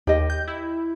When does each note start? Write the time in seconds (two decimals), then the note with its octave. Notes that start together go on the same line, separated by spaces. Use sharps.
0.07 D#2 G4 D#5
0.30 G6
0.48 E4